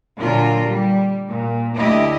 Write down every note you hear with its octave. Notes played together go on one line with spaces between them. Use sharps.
A#2 D3 F#3 F4 A#4
G3
A#2
D2 E4 G4 D#5